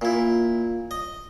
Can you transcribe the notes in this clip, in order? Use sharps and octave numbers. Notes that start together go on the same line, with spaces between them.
A#2 E4
D#5